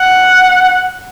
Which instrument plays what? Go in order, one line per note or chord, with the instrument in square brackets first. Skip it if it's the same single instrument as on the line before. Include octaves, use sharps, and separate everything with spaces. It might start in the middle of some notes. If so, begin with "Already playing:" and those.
Already playing: [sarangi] F#5